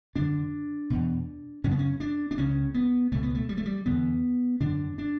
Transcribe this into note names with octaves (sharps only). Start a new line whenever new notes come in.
F#2 D3 D4
E2 B2
F#2 C#3 C#4
B3
C#4
D4
D4
C#2 C#3 C#4
B3
C#2 B2 A3
B3
A3
G3
A3
G3
E2 D3 B3
F#2 D3 D4
D4